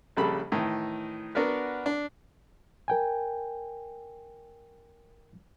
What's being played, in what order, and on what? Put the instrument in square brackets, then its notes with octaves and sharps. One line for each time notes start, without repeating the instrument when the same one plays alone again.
[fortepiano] A#1 C#3 G3 A4 B5
A2 D#3 E3
B3 D4 F#4 A#4 B4
D4
[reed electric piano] A#4 G5 G#5